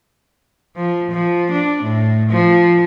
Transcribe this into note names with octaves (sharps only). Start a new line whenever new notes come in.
F3
F3
D4
A2
F3